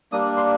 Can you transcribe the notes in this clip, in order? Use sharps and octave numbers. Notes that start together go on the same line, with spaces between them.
G3 A#3 D4 D#6
C6